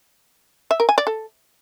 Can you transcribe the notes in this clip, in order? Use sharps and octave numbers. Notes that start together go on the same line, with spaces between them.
E5
A#4
G#5
D5
A4